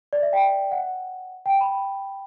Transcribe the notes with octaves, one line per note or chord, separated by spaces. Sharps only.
D5
E5
G5
F#5
G5
B5